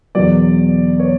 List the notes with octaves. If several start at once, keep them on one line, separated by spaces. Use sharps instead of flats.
E2 B2 F#3 D5
C#5